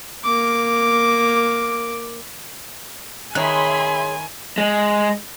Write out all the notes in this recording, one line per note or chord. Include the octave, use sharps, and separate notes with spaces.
A#3 D6
D#3 G#4 C#5 E5 G#5 B5 C6 F#6
G#3